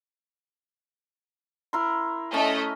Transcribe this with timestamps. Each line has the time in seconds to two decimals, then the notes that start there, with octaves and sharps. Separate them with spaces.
1.73 E4 A#4 C6
2.34 A3 C#4 D#5